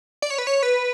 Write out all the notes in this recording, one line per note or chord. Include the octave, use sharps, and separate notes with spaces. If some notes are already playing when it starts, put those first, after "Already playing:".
D5
C#5
B4
C#5
B4